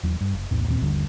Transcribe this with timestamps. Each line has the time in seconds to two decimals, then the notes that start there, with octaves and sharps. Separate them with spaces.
0.03 D#1 E2 F#3
0.21 G2
0.33 F#1
0.51 B1 E2 A2
0.68 D#2 A#2 F#3 C4
0.81 G1 D#2 D3 G3